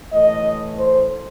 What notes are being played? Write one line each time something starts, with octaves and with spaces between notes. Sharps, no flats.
A2 E3 A3 D#5
C5